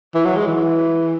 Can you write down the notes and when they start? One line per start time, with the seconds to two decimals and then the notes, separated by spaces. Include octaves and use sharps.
0.15 E3
0.25 F#3
0.36 G#3
0.47 E3